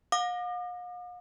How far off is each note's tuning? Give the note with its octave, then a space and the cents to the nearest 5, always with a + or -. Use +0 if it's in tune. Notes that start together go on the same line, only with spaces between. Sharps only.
F5 +45 D6 +45